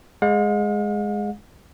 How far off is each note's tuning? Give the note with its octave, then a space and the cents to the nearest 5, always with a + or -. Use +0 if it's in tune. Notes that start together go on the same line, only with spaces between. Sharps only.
G#3 +0 F5 +45